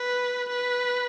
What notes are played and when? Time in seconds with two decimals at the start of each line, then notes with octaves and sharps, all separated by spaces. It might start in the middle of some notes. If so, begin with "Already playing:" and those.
Already playing: B4
0.49 B4